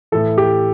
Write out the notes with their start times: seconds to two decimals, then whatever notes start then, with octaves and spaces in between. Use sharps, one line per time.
0.12 A2 E3 A4
0.38 G4